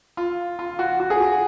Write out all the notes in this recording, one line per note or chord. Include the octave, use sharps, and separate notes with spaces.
F4
F4
F#4
F#4
G#4
F#4